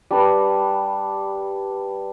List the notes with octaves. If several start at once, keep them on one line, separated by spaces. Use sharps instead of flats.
G3 D4 B4